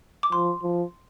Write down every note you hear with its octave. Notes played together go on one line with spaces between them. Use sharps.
D6
F3 C6
F3